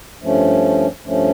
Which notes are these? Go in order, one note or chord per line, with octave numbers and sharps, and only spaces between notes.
G2 F3 A3 C#4
G2 F3 A3 C#4